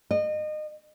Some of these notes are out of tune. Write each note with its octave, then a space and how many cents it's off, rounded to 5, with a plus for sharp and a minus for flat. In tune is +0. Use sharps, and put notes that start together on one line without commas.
D#5 -30